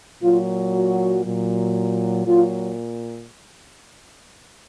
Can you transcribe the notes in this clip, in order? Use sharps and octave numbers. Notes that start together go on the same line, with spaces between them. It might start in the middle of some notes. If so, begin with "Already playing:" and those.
A#2 F#3 F4
F#4
A#2 F#3
A#2 F#3 F4